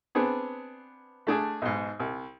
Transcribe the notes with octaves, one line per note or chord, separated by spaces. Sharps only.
B3 C4 D4 G#4
A3 D4 G#4
B1 G#2
C2